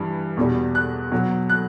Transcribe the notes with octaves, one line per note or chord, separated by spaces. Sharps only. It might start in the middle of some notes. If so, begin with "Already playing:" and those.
Already playing: G2 E3 G3
E2 B2 G3
F#6
B2 F#3
F#6